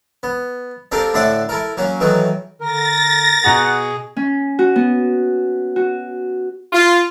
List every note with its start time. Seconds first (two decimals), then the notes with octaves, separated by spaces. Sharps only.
0.23 B3
0.92 C4 D4 F4 G4 A4 A#4
1.14 A2 D3 D4 D5 E5 F#5
1.49 E4 A4 A#4
1.77 F#3 A#3 C#4
2.00 D#3 E3 F#3 A3 D#4
2.61 D3 A#4 A6 A#6
3.44 B2 G#4 F#5 A#5
4.16 C#4
4.59 F#4
4.76 B3
5.76 F#4
6.73 F4